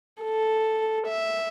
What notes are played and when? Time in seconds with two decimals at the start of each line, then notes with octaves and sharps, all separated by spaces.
0.22 A4
1.07 E5